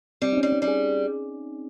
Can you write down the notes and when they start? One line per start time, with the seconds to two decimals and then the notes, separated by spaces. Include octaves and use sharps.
0.22 G3 C4
0.33 D#4
0.37 C#4
0.43 G3
0.52 C#4
0.62 G3
0.68 G#4